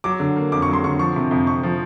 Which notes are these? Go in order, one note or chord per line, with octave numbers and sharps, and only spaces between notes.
F#3 D6
D3
A#3
F2 D6
C#6
F#3
C6
D3 C#6
F3 C#6
C3
F2
F2 C#6
F3